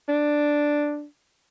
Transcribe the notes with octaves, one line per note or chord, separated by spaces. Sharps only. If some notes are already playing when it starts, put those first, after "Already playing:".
D4